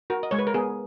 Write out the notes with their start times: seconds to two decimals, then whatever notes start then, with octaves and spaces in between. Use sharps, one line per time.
0.10 F#4 A#4
0.23 D#5
0.31 G#3 C#5
0.39 B4
0.47 A#4
0.54 B3 G#4